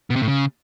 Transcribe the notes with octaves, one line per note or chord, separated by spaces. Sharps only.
B2
C3
A2
C#3